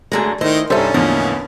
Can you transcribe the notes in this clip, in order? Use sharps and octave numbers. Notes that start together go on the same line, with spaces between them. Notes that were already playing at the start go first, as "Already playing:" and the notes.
F#2 D3 G#3 A3 G#4 A#5
D#3 A3 E4 C5 D#5
C2 G2 G3 C#4 D#4 A4 C5 E5
E2 A2 D3 F3 A#3 D#5